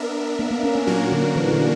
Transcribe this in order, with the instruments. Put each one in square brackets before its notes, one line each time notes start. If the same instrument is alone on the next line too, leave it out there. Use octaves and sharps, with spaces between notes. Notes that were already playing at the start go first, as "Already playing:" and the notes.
Already playing: [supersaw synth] B3 D4 A#4 E5
[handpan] A#3
A#3
C#4
A#3
[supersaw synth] A#2 A#3 D4 F#4 A#4 [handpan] F#3
[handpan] D3
E3
D3